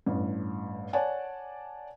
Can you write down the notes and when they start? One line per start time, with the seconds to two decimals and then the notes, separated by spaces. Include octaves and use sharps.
0.06 A1 G2
0.93 C#5 D5 F#5 G#5 A5